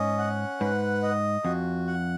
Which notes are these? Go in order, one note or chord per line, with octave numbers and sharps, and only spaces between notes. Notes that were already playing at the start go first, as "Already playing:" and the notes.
Already playing: G#2 C#4 D#5
F#5
G#2 B4
D#5
F2 F#4
F#5